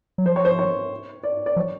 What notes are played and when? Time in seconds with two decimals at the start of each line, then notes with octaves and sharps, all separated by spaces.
0.18 F#3
0.26 F3 C5
0.36 C#5
0.45 C5
0.59 C#5
1.23 D5
1.46 D5
1.56 F3 C#5